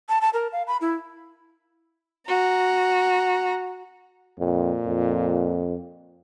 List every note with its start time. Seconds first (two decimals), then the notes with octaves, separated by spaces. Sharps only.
0.09 A5
0.21 A5
0.34 A#4
0.52 F5
0.67 B5
0.81 E4
2.27 F#4 A#5
4.39 F2 A#2
4.86 F2